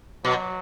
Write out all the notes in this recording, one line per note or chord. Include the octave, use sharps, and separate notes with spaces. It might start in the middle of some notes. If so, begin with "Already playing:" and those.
B2 F#3